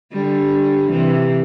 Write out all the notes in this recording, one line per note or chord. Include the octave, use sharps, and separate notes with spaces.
D3 G3
C3 E3